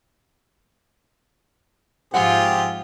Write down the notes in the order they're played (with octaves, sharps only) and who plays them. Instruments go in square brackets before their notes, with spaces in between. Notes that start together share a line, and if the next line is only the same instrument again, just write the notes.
[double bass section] G#2 F3 [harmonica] C4 G4 G#4 [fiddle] F4 [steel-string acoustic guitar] F#5